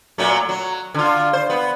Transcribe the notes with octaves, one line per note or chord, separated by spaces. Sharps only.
A#2 F#3 A3
F#3
D3 F4
C5
B3